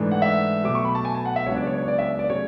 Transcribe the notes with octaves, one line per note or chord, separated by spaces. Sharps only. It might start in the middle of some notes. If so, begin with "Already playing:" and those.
Already playing: G#2 E3 A3 D4
F#5
E5
B2 F#3 A3 D6
C#6
B5
A5
G#5
A5
F#5
E5
C#2 C#3 F#3 B3 D4 C#5
D5
C#5
C#5
D5
E5
D5
C#3 F#3 A3 C#5